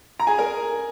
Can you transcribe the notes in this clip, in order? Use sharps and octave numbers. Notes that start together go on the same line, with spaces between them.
A#5
G#4 G#5
A#4 A#5